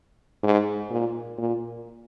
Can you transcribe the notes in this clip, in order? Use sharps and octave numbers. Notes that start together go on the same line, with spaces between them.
G#2
A#2
A#2